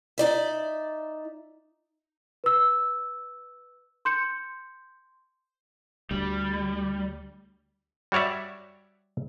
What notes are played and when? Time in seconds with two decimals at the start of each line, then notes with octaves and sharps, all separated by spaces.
0.18 D#4 D5 E5
2.44 B4 E6
4.05 C6 G6 C#7
6.11 D2 G3
8.12 G3 F#4 C#5 D5 E5